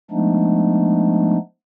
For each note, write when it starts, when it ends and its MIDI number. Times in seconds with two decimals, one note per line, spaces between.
0.11 1.37 53
0.11 1.37 56
0.11 1.37 57
0.11 1.37 59
0.11 1.37 62
0.11 1.37 63